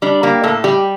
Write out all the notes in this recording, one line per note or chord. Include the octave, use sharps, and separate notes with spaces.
G3 D4
A#3 G4
A2 A4
G3 G4